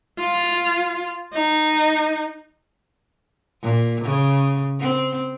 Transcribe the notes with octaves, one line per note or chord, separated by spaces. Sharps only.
F4
D#4
A#2
C#3
C4